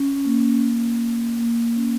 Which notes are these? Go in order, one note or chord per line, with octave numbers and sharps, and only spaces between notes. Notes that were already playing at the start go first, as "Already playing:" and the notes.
Already playing: C#4
A#3
A#3
C#4